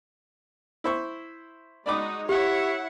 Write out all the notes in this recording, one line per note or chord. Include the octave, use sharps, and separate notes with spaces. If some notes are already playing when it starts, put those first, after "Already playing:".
E4 C5 C#6
G#3 D#4 F#4 D5 B5 D6
E4 G4 C#5 E5 F#5